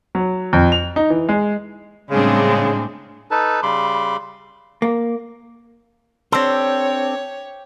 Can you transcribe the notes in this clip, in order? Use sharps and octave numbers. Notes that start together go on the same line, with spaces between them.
F#3
F2
F7
D#4
E3
G#3
A2 C#3 G3 G#3 C4 D4
D#4 A4 B4 A5
C#3 G3 B5 C6 D6
A#3
C4 D4 G4 A4 C5 C#5